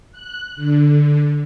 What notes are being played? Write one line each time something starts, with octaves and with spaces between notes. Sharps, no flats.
F#6
D3